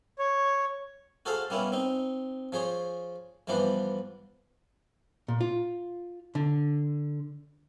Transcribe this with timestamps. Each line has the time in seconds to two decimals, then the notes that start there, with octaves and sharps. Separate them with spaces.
0.19 C#5
1.26 F#4 G#4 A4 C5 F5 A5
1.50 G3 A#3 B3 C#4 E4
1.72 C4 D#4
2.52 F3 G#4 C5 C#5
3.47 G2 E3 F3 B3 D4 C5
5.28 A#2
5.41 F4
6.35 D3